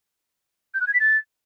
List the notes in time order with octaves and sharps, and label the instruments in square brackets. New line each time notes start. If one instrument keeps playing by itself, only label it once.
[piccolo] G6
F#6
G#6
B6
A6